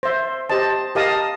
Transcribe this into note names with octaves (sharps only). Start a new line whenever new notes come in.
C5 E5
G4 C5 D#5 A5
G4 A#4 D#5 F5 A5 D#6